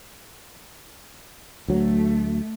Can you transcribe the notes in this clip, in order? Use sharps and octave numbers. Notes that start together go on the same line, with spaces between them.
D2 F#3 A3